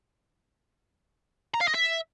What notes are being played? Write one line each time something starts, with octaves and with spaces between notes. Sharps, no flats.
A#5
F5
D#5
E5